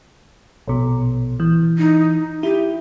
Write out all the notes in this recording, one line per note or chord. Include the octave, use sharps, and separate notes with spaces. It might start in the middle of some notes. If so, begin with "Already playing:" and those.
A#1 B2
E3
D#4
E4 G4